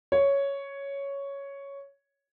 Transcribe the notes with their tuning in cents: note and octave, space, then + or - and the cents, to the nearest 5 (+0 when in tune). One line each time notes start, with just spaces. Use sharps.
C#5 +5